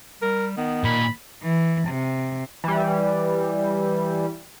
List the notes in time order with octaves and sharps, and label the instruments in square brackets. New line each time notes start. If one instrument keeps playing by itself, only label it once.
[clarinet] G3 [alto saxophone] A#4
[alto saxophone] D#3 [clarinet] B3
[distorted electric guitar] A#2 [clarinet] B5
[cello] E3
C3
[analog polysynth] E3 G3